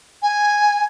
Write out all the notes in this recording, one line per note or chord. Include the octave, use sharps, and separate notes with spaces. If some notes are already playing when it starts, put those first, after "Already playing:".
G#5